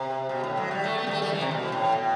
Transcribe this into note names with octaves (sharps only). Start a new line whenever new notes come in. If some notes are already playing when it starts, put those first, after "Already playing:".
Already playing: C3
B2
A2
F#3
G3
A3
B3
G3
A3
G3
E3
C3
B2
A2
B2